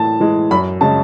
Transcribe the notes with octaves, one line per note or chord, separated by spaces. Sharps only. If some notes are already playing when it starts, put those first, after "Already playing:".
Already playing: A2 E3 A5
E3 G#3
F#2 B5
C#3 G#3 A5